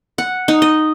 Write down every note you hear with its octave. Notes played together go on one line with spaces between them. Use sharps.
F#5
D#4
D#5